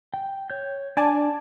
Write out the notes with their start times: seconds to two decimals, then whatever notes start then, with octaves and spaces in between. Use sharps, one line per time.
0.14 G5
0.50 C#5 G6
0.97 D4 D5 G#5 A5